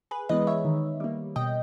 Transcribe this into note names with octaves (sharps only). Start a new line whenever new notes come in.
G#4 B4
E3 G#3 B3 B4 D#5
C#5 E5
D#3
G3 A#3
B2 D#5 G5